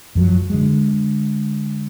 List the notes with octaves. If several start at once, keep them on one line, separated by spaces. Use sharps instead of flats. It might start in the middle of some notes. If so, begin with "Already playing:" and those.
F#2 F3 F#3
D3 G#3